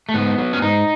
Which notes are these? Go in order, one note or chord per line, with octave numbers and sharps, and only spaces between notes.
A3
G#2 B3
F#3
C#4
G#2 D#4